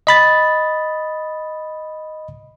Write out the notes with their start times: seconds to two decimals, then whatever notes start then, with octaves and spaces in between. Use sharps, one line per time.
0.07 D#5 B5 A6